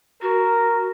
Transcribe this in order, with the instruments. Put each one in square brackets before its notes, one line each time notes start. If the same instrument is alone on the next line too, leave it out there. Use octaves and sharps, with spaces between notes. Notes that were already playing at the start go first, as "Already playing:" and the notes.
[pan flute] F#4 [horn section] A#4